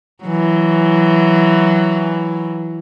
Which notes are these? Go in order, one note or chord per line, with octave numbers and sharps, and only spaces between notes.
E3 F#3